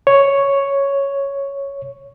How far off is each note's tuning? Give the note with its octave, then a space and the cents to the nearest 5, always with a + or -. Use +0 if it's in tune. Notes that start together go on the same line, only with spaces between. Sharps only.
C#5 +0